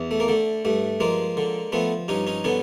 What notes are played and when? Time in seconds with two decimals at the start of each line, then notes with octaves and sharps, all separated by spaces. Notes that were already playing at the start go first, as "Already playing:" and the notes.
Already playing: E2
0.11 A3
0.20 A#3
0.28 D3 A3
0.65 G2 A3
1.00 F3 G#3 A#3
1.37 D3
1.72 F3 A3 B3
2.08 G2 C#4 D#4
2.27 C#4 D#4
2.44 D3 B3 C#4